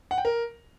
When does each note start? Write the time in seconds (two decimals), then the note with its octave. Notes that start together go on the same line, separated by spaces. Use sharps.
0.11 F#5
0.18 G5
0.25 A#4